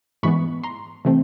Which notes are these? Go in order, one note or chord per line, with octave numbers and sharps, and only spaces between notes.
G#2 E3 G#3 B3 B5 C#6
A#5 C6
C3 E3 A3 C4